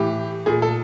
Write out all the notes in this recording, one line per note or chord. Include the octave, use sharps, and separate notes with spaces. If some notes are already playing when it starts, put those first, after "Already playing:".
Already playing: A2 E3 G4
A#2 G#4
A4